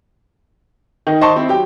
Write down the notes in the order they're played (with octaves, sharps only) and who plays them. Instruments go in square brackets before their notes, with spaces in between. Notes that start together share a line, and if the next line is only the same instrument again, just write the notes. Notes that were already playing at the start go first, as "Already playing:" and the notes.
[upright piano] D#3 D#4
C5 D#5 A5 C6 C#6
C4 E4
F#3 G4 G5